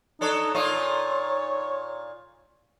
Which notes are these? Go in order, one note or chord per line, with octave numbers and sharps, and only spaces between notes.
D4 D#4 A4 C#5
A#2 D#4 F4 C#5